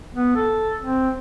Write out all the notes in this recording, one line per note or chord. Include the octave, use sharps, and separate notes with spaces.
B3
A4
C4